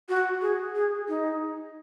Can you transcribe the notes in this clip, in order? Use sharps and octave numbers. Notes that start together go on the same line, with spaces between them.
F#4
G#4
G#4
D#4